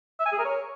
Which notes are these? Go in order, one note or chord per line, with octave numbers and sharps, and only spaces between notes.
E5
G#5
G#4
A#4
C#5